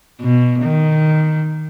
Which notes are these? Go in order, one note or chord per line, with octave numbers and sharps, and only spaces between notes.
B2
D#3